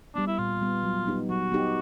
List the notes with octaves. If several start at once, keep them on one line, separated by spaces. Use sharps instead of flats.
G3 B3 D4
E4
A#2 F4
G3 B3
F#3
B3 D#4 G4
F#3 F#4
B3 D#4 G4